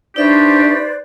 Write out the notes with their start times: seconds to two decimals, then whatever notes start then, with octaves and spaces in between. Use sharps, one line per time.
0.16 D4 D#4 G4 B4 C5 D5 E5 C#6